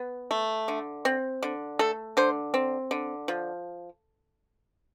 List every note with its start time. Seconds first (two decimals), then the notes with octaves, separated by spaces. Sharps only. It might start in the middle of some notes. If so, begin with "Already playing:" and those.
Already playing: B3
0.31 A3
0.68 D3
1.05 C4
1.43 D3
1.79 A3 A4
2.17 D3 C5
2.54 C4
2.91 D3
3.28 F3